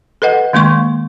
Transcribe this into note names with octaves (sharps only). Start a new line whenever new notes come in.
A4 B4 D#5 F#5
D#3 G#3 A#3 C6 C#6